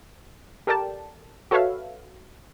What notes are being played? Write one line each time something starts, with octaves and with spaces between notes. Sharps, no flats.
G4 A4 A#4 D5 G5 A5
F#4 A4 B4 C#5 E5 F5